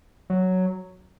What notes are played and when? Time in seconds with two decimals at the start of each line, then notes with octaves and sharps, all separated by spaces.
0.30 F#3